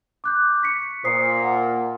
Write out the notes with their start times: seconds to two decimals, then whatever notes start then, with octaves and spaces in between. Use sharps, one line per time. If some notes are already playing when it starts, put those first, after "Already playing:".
0.24 D6 F#6 G6
0.62 C#6 B6 C#7
1.04 A#2 C5 D#6 C7
1.43 F#5